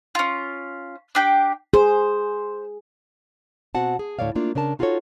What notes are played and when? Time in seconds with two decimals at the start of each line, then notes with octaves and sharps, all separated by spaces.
0.15 C#4 F4
1.15 D4 G4 G5
1.74 G#4 C5
3.75 B2 C4 F#4 F#5 A5
3.99 G#4
4.19 D2 A2 D#3 C#5 D5 F5
4.35 A3 A#3 D4 F4
4.55 C#3 D4 A#4 A5
4.79 D#4 F4 F#4 G#4 A4 C#5